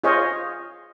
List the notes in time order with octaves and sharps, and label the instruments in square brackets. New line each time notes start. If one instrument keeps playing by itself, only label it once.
[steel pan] F4 G#4 C5 C#5 D#5 F5